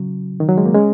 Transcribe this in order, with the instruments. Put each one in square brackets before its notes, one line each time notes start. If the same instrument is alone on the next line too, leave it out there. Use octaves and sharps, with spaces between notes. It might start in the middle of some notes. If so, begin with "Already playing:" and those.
Already playing: [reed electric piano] C#3 F#3
D#3
F#3
G#3
A#3
G#3 C#4